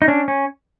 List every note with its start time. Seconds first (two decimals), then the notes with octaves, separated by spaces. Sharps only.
0.02 D#4
0.08 C#4 D4
0.28 C#4